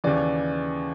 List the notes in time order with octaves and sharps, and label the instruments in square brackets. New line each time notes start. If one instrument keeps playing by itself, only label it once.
[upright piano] D#2 C#3 E3 D5